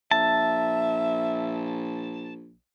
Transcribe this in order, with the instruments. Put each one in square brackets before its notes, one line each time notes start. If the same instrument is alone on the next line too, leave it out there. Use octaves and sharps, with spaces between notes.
[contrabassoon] A#1 [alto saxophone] E5 [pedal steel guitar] A5